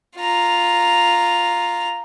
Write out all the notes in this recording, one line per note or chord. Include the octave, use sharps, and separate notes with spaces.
F4 A#5